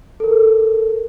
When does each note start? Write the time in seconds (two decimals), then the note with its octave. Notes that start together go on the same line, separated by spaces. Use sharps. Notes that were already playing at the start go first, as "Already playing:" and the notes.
0.20 A4 A#4